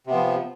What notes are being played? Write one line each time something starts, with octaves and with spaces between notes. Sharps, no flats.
C3 F3 B3